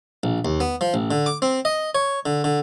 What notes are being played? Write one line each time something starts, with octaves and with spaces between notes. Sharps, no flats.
A#1
D#2
B3
F3
A1
D3
D6
C4
D#5
C#5
D3
D3